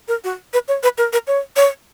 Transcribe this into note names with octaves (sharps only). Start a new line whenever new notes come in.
A#4
F#4
B4
C#5
B4
A#4
A#4
C#5
C#5